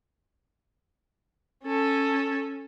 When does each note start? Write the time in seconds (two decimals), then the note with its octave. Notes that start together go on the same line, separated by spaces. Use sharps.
1.64 C#4 A4